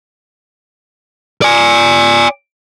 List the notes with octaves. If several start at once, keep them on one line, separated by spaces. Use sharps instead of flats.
D5 G#5